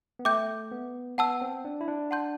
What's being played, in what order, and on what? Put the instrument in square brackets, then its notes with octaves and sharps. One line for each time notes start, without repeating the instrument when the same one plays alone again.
[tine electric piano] B3
[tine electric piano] A3 [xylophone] E5 G5 D6 G6
[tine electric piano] B3
[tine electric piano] B3 [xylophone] F#5 A5 E6
[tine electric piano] C4
D4
E4
D4
[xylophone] F#5 A5 C6 G6